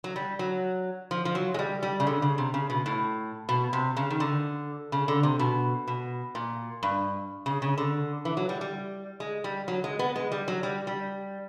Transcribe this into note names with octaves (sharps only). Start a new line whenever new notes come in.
F#3
G3
F#3
F3
F3
F#3
G#3
G3
G3
C#3
D3
C#3
C3
C#3
B2
A2
B2
C3
C#3
D#3
D3
C#3
D3
C3
B2
B2
A#2
G2
C#3
C#3
D3
E3
F#3
G3
G3
G#3
G3
F#3
G#3
B3
G#3
G3
F#3
G3
G3